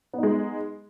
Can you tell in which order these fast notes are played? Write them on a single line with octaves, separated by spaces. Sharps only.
B3 D#4 G#3